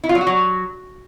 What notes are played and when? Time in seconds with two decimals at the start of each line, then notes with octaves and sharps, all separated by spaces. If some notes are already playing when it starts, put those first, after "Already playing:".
0.04 E4
0.09 F4
0.15 F#3
0.21 F#4
0.27 F#3